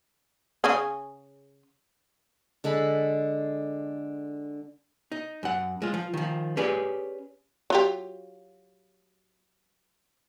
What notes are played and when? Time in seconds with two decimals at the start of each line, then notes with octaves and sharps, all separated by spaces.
0.64 C#3 C#4 G#4
2.64 D3 G#3 A4 B5
5.12 D#4
5.43 F#2 F#5
5.82 G#3 F4
5.94 F3
6.14 D#3 F3
6.57 C#4 G4 G#4 B4 D5
7.70 F#3 F4 G4